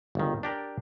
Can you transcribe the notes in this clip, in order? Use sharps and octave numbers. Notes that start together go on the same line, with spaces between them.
G1 C#2 D#3
D4 G4 A#4 D5